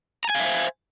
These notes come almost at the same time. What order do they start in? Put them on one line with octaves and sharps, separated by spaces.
A#5 G#5 F5 E5 C5